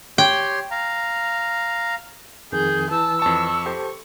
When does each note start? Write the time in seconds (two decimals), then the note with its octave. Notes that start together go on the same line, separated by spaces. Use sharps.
0.18 G4 C#5 G5 C6
0.71 F5 A#5
2.52 F2 D#3 G#4 G6
2.91 E3 A5 E6
3.22 F2 A5 C#6
3.66 G4 A4 C5